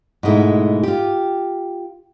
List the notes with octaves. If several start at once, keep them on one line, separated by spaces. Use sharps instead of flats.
G#2 B2 G#3 A3 B3 E4
F4 G4